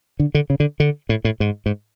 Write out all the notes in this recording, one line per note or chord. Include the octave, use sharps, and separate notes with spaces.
D3
D3
C#3
D3
D3
A2
A2
G#2
G#2